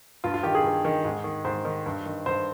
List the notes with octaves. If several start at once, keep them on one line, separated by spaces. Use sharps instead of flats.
G2 F4
F4
D#3 G4
G#4
G2
D#3
G#2
D#3
G#2 C5
D#3
G2
D#3
G2 C5